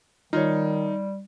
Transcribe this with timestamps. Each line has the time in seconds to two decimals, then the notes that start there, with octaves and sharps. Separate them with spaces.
0.33 D#3 G3 D#4 F4 C#5